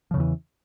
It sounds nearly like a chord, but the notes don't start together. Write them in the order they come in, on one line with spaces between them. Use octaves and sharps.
F3 C#3 E2 E3